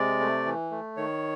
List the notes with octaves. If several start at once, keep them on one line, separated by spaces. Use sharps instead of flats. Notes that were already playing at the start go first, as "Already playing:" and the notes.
Already playing: C3 G#3 D5
A3
E3
A3
D#3 C#5